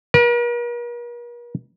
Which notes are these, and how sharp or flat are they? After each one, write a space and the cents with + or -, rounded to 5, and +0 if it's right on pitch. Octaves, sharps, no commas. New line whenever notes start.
A#4 +45